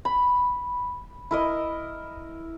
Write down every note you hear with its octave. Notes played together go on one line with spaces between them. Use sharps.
B5
E4 A#4 D#5